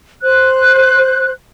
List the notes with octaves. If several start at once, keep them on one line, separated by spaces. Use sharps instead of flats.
C5 F#6